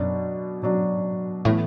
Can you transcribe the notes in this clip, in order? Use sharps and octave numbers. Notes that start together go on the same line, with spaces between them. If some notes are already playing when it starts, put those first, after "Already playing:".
Already playing: F#2 B2 F#3 D4
B2 F#3 D4
A2 E3 A3 B3